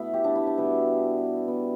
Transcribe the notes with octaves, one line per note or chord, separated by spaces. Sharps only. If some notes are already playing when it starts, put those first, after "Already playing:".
Already playing: B2 A3 B3 E4
G4
D4
E4
D4
B2 G3 B3
B3